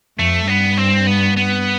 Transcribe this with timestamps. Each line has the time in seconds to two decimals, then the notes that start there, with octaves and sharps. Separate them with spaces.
0.18 F2 A3
0.47 G2 B3
0.77 C4
1.07 B3
1.37 B3